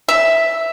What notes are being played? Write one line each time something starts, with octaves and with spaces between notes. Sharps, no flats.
E5